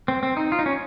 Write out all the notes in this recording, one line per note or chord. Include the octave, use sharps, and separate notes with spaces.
C4
C4
D#4
F4
D#4
C#4